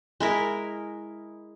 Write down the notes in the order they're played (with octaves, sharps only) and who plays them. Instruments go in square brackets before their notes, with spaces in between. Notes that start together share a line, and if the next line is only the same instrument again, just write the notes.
[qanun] G#3 E4 A#4